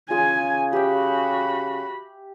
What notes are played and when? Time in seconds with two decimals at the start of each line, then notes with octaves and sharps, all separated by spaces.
0.10 C#3 F4 G#4 G#5
0.73 F#4 G4 E5 G5 B5